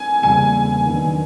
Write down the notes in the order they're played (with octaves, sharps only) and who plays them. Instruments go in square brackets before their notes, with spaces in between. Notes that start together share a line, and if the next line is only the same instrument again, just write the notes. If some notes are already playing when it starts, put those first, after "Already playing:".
Already playing: [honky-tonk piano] G#5
[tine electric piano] E2 C#3 E3 G3 A#3 [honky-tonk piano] G#5
[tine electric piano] D#3 F#3 B3 D4